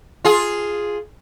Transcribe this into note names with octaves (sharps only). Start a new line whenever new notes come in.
F4 G#4